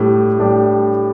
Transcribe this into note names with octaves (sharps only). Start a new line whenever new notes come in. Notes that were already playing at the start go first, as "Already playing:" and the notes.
Already playing: A2 G3 D4 G4
A2 G3 D4 G4